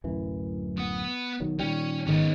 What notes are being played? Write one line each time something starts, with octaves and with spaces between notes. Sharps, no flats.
D1 F#2 E3
B3 F#5 D#6
B1 D#3 F#3
A#2 D#3 G3 C#4 G5
G#1 G#2 D#3 B3 C#4